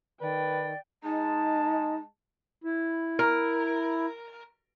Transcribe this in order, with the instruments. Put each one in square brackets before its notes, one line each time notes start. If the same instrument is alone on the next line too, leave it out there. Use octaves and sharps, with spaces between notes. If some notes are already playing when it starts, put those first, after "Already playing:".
[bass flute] D#3 [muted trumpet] B4 [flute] D5 [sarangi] G5
[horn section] G#3 A5 [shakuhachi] D#4
[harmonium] E4
[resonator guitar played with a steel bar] A#4